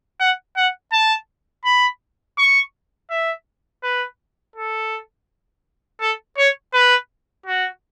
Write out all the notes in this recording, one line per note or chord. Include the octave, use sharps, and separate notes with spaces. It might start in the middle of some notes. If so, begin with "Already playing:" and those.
F#5
F#5
A5
B5
C#6
E5
B4
A4
A4
C#5
B4
F#4